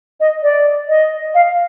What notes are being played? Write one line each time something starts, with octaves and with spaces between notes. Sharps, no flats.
D#5
D5
D#5
F5